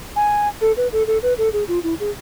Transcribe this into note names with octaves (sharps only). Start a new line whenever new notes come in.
G#5
A4
B4
A4
A4
B4
A4
G#4
F4
E4
G#4